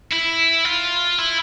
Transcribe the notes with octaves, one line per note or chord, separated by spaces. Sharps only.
E4
F4
E4